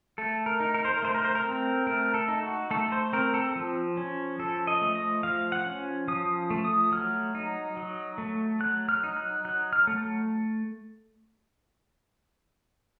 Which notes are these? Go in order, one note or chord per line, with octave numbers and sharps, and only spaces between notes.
A3 A4
A#4
D#4
A#4
C5
A#4
A3 C5
A#4
C5
A#4
C4
A3 A#4
A4
D#4
F#4
A3 A4
C5
C4 A#4
A4
F3
C#4
F3 A4
D#5
A3
D#5
F3 F5
F#5
C#4
F3 D#6
A3
D#6
F#3 F6
D#4
F#3
A3
F#3 F#6
F6
D#4
F#6
F#3 F#6
F6
A3